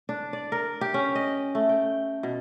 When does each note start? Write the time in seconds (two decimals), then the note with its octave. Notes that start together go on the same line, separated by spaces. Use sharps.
0.09 D4
0.33 D5
0.52 A#4
0.81 G4
0.94 C#4
1.15 D#5
1.55 A3
1.69 G5
2.23 B2